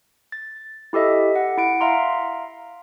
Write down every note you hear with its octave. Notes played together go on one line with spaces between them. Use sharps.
A6
E4 G4 A4 D#5 E5
F#5
E4 F#5 D7
E5 F5 A#5 C6